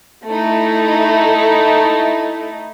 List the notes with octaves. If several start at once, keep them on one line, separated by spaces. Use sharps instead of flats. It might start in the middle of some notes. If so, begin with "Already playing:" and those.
A3 D#4 E4